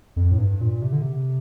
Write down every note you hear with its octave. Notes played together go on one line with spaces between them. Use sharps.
F2
A2
G2
A#2
C3
D3
C3